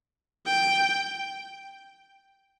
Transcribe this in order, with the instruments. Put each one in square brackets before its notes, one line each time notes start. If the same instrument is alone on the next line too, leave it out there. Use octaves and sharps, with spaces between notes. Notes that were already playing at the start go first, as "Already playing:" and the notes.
[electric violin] G5